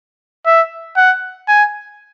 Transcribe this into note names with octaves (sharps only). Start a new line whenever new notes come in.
E5
F#5
G#5